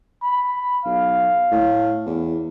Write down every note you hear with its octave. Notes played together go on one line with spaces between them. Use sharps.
B5
B1 F5
A2
E2